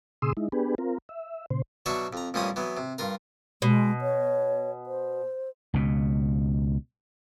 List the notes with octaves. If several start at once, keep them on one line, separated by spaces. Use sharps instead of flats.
A#2 C#3 G#4 C6 D#6 E6
G#3 D#4 E4
B3 D4 G4 G#4 B4
C4 F4 A#4
E5
A#2 C#3 C5
B2 F#3 D4 F#4 E5 C#6
F2 A#5
A1 A#2 F3 G3 C#4 D#6
E3 F#3 B3
C3
G2 F4 A#4
B2 G#3
C#5
C5
C#2 B2